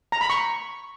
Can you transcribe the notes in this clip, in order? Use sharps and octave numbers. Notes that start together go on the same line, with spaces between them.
A#5
B5
C#6